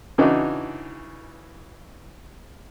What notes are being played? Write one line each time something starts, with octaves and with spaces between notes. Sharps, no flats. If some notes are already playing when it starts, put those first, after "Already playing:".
C#3 E3 D4 D#4 F#4